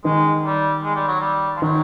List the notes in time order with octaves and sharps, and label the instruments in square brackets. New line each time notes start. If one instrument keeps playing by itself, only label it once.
[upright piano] D#3 D#4 [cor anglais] G#3
[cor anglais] G3
G#3
G3
F#3
G3
F3
[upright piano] D#3 D#4 [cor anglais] F#3